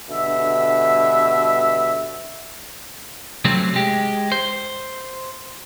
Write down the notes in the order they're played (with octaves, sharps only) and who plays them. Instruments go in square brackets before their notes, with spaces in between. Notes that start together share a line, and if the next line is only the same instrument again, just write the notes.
[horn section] G2 B2 D3 E5
[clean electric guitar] C3 F#3 A3 C4 C#4
G#3 G4
C5